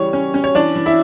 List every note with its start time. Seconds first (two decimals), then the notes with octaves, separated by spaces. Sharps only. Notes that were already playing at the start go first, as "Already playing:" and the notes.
Already playing: C#3 E3 G3 C#5
0.13 C#4
0.34 C#4
0.44 C#5
0.54 E3 D4 D5
0.76 E3
0.86 E4 E5